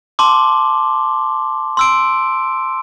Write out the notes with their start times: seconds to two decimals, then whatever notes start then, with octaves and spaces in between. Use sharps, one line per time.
0.19 A5 C6 D6
1.77 C6 E6 D7